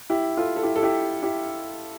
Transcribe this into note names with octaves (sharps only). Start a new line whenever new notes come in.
E4 G4
F4 A4
A4
E4 G4
A4
E4 G4
E4 G4